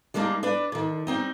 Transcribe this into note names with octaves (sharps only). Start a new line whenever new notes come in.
G3 G#3 A#3 D4 D#4
D4 B4 D5
D3 D#3
G3 C4 D#4